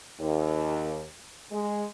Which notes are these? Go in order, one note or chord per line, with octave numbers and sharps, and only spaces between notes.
D#2
G#3